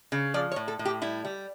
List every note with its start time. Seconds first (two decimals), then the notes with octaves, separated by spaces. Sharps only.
0.12 C#3
0.34 F3 D5
0.52 C#5
0.56 A2
0.68 A4
0.79 A2
0.85 G4
1.02 G3 E4
1.25 G3